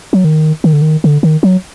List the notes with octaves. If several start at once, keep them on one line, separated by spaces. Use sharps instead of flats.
F#3
D#3
D#3
D3
D#3
D3
D#3
F#3